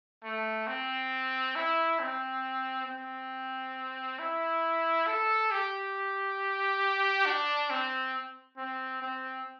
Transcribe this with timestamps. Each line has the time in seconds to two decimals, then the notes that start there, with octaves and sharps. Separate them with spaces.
0.24 A3
0.67 C4
1.55 E4
2.00 C4
2.86 C4
4.19 E4
5.07 A4
5.51 G4
7.26 D4
7.70 C4
8.57 C4
9.02 C4